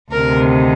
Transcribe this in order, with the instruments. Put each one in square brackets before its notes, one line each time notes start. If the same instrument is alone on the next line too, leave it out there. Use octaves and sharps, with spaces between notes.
[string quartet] D2 C3 D#3 A#4